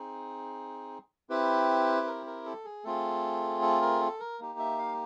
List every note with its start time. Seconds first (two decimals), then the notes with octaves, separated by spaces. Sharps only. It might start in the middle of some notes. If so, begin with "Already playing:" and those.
Already playing: C4 D#4 G#4
1.29 C4 E4 G4 B4
2.07 A#4
2.26 A#4
2.46 A4
2.65 G#4
2.84 A3 C4 F4 G#4 A4
3.62 A4
3.81 A#4
4.01 A4
4.20 A#4
4.39 A#3 D#4 G4
4.59 E5
4.78 F5